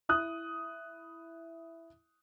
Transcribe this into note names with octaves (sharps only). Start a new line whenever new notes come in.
E4 D#6 F#6